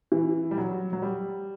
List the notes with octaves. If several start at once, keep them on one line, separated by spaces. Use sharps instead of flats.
E3
G3
F#3
F#3
G3